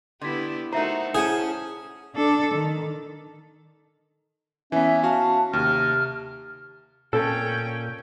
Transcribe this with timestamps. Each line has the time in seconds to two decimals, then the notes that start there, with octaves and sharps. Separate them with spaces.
0.21 D3 B3 E4 G4 C6 G#6 B6
0.72 A3 D#4 F#4 A4 A#4 C5 E5 A#5
1.15 C#4 E4 G#4 C5 F#5 A5 G#6
2.16 D4 A4
2.54 D#3
4.72 E3 B3 C#4 E5
5.04 F#4 F5 A5
5.53 D#2 C3 F6
7.13 A#2 C#4 A4 G5